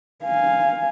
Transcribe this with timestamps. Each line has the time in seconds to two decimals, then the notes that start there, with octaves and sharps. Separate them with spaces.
0.24 F5 G#5